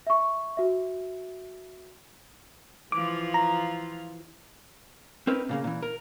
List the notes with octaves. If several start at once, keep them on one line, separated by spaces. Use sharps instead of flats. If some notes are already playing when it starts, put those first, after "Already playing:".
E5 C#6
F#4 E5
E3 F3 F4 D6
A#5
C4 C#4 D#4 A#4 B4
A#2 C#3 A#3
A#2 E3
A#4